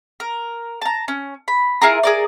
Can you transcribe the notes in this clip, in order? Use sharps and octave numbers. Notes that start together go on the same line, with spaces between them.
A#4
A5 A#5
C#4
B5
E4 F4 G#4 A#4
G#4 A#4 D5